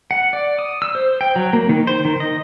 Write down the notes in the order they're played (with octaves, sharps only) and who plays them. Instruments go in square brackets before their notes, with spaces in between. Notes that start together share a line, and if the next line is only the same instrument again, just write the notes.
[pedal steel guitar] F#5
D5
D#6
E6
C5
G5
F#3
A#3
D#3
C5
D#3
D#5